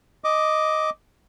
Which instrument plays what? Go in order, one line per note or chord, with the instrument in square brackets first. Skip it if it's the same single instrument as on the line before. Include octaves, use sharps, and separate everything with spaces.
[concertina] D#5 D6